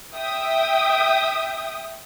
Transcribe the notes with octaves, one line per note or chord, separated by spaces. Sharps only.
E5 G5 D#6